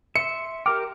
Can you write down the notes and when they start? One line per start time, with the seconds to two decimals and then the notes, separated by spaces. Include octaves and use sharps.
0.16 E5 C6 C#7
0.66 G4 A#4 G5 D6 F6